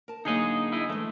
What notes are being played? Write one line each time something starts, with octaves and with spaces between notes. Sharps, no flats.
A#4 A5
D3 F#3 A#3 D#4 G#4 D#5
E4 D#5
E3 G#3 A3